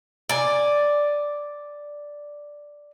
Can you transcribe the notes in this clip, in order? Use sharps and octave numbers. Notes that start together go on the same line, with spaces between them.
D5 G#5